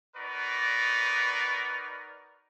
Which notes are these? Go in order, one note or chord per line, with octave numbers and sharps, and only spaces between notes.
D#4 F#4 A#4 B4 D5